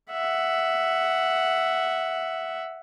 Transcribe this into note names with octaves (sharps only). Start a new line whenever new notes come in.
E5 F#5